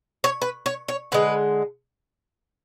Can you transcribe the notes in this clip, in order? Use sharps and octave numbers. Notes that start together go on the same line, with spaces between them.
C#5
B4
C#5
C#5
D3 G#3 B4